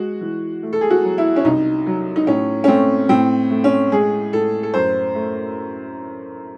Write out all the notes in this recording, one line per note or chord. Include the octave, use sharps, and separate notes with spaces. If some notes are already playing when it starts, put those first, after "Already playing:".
Already playing: G#3 F#4
E3
A3
A4
G#4
F#4
F#3
E4
C#4
C2 D#4
F#3
D#4
A2 C#4
C#4
A3 C4
A2 C4
A3
C#4
G#3 G#4
A2 A4
A4
F#2 C5
A3